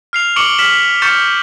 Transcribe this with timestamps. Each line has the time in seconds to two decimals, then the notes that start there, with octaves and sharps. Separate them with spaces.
0.13 F6 C7 F7
0.36 C#6 D6 C#7 D7 F#7 G7
0.58 F6 B6 E7 F#7
1.02 C#6 F6 G6 A6 C#7 E7